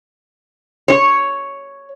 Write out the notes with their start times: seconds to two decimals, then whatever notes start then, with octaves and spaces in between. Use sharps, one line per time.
0.88 C#5